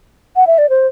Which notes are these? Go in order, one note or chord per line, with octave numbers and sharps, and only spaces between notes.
F#5
E5
D5
C5